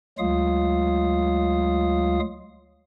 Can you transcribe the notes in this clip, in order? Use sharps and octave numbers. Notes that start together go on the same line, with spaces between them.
D2 F#3 G#3 F4 F5 D#6